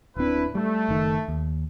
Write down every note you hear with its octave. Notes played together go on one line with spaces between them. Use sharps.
D1 C4 D4 E4 B4
G3 A3
F#1 D#3
D#2